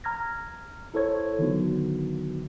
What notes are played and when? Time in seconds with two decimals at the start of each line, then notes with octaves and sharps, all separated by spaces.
0.04 A#5 F6 G#6 A#6
0.94 E4 A4 C5 C#5 G#6
1.39 D3 D#3 F#3 B3 D#4 F#4